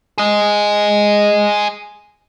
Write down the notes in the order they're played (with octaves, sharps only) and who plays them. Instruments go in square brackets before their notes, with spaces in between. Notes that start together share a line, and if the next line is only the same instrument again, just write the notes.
[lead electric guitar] G#4 D#5